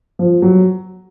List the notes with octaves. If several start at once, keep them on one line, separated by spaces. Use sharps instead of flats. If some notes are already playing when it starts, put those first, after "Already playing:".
F3
F#3